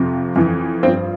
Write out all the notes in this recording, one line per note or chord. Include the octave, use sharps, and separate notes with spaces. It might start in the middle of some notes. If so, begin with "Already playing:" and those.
Already playing: F2 C3 F3
F2 E3
G2 F3 C4